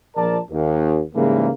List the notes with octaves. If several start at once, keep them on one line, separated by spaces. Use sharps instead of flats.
A#1 F3 A#4 D5 A5
D#2
G#2 C#3 E3 G3 A#3